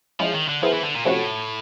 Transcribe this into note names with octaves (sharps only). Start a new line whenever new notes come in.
F3 G#3 C#4 E4
D#3
D3
F3 B3 E4 G#4 C5
E3
D3
A#2
A2 C3 F3 A3 C#4 F#4